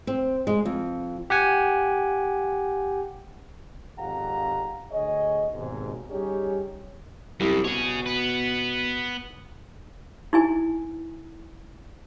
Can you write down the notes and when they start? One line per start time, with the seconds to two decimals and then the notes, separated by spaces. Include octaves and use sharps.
0.07 C4
0.47 G#3
0.65 F2
1.30 G4 F#5 G#5
3.98 G#1 F2 G4 F5 F#5 A#5
4.92 D2 G#4 C#5 D#5
5.54 G#1 D#2 G#2 B2
6.11 G3 C#4 D#4 G4 G#4 C#5
7.40 C2 F#2
7.64 B2 G#4 C#5
8.06 B3 B4
10.33 D#4 E4 G#5